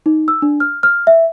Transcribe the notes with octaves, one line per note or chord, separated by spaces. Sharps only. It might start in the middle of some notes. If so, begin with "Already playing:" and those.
D#4
E6
D4
F6
F6
E5